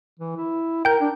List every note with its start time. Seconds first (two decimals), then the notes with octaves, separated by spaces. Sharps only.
0.19 E3
0.36 E4
0.85 A#4 G5 G6
1.01 D4